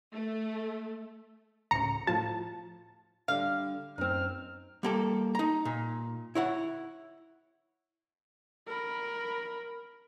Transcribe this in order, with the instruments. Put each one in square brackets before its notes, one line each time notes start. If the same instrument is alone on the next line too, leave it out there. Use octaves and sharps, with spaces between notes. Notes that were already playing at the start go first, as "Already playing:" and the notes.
[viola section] A3
[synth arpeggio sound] D2 A2 C#3 [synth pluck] A#5 C#7
[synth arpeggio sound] A2 F3 F4 [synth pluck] A5
[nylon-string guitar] D3 G3 [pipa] F5
[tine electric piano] F#2 [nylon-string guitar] C4 D#4 [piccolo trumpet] F6
[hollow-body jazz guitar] G3 A#3 A4
D#4 A#5
A#2
E4 C#5 F#5
[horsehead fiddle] A#4 B5